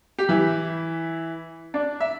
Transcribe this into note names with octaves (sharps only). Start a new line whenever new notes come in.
G4
E3 E4
D4 D5
E5